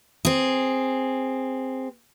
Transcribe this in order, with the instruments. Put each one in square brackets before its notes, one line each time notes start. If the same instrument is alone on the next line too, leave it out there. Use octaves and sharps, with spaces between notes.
[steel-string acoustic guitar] C4 G#4